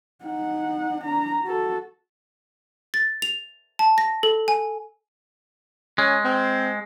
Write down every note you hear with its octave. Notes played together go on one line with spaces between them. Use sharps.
D#4 F#5
D4 A#5
F#4 A4
A6
F7
A5
A#6
A4
G#5
G#3 C#4
C4